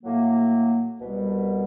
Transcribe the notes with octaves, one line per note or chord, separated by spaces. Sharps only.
A2 F#3 A#3
C2 B2 G3